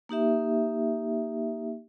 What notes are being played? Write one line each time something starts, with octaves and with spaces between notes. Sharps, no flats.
A#3 D#4 G4 E5